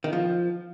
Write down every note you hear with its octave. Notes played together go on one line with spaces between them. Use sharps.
D#3
F3